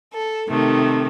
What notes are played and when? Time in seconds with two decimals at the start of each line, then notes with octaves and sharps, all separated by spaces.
0.14 A4
0.48 C3 D#3 A3